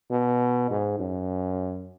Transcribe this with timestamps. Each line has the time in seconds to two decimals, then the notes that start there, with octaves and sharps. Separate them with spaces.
0.11 B2
0.70 G#2
0.99 F#2